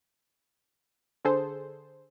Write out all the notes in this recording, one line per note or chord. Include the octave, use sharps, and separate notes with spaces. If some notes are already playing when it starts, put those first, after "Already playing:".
D3 G#4 A4 C5